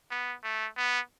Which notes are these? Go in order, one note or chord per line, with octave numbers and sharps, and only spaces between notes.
B3
A3
B3